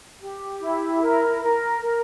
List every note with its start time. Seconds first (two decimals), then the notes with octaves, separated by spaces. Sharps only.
0.19 G4
0.60 E4
1.01 A#4
1.42 A#4
1.82 A#4